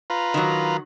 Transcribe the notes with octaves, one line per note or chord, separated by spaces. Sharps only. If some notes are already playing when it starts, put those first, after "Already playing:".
F4 B4 A#5
D#3 F#3